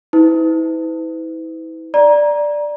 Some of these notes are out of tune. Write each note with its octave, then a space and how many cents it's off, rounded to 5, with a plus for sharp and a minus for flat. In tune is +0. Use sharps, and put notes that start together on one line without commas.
E4 -35 B4 +40
D5 +0 A#5 +20